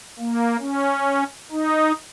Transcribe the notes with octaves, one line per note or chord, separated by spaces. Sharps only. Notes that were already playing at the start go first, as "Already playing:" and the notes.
A#3
C#4
D#4